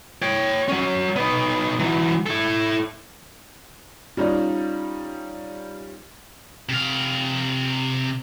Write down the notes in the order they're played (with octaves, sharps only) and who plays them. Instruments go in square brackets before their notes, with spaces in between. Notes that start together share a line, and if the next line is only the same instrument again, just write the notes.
[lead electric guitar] C#5 G5
F#3 C#4
B3 D#4
E3 F#3
E4 A4
[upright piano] G3 C#4 D#4 F4 D5
[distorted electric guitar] C3 F5